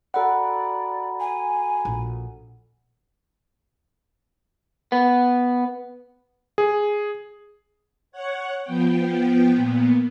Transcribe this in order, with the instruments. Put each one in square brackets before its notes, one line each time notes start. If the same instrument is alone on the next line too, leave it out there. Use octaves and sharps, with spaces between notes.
[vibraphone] F#4 A#5 B5 [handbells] A4 F#5 [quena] D5
[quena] G#5
[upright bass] A#1
[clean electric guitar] B3
[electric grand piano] G#4
[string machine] C#5 F#5
F3 B3 G5
A#2 B3